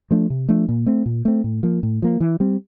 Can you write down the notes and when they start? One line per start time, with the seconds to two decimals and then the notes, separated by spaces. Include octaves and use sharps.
0.11 F3 A3 D4
0.30 C3
0.49 F3 A3 D4
0.68 A#2
0.86 A3 C4
1.06 A#2
1.25 A3 C4
1.44 A2
1.63 F3 A#3
1.83 A2
2.02 F3 A#3
2.20 E3
2.40 G3 C4